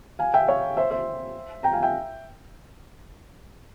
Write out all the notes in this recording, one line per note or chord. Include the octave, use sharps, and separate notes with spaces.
F5 G#5
E5 G5
C#5 F5
C5 E5
C5 E5
G5 A#5
F5 G#5
E5 G5